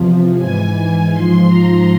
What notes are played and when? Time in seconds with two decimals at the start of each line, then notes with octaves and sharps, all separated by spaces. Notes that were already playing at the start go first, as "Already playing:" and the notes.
Already playing: E2 C3 F3
0.37 G#2 E3 G#5
1.11 G#2 F3 C6
1.47 A#5